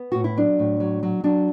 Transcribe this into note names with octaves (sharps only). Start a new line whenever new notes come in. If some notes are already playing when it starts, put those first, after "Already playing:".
Already playing: B3
A2 F#4
E4
F#3 D4
A2
F#3
F#3
F#3 D4